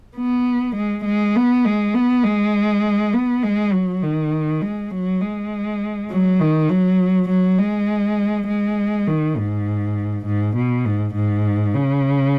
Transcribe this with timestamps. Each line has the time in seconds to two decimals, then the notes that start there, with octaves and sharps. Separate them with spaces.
0.17 B3
0.76 G#3
1.05 G#3
1.35 B3
1.65 G#3
1.94 B3
2.24 G#3
3.13 B3
3.43 G#3
3.73 F#3
4.02 D#3
4.61 G#3
4.91 F#3
5.22 G#3
6.10 F#3
6.40 D#3
6.69 F#3
7.29 F#3
7.59 G#3
8.47 G#3
9.07 D#3
9.37 G#2
10.26 G#2
10.56 B2
10.85 G#2
11.14 G#2
11.74 C#3